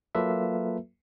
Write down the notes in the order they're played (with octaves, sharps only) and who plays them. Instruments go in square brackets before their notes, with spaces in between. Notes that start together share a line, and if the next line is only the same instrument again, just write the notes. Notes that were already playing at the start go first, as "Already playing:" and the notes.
[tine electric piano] F#3 A#3 F4 A4 B4 E5